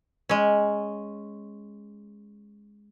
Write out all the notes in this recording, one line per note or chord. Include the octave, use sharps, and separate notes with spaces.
G#3 C#4